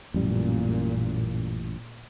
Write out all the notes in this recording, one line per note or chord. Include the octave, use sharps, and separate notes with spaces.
A1 F#2 A#2 G3